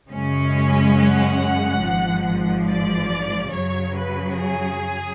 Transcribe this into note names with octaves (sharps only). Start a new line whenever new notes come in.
F#2 C#3 G#3 C#4
F#5
G#1 G#2 F3
D5
F#2 C#3 F#3 C#5
B4
G#4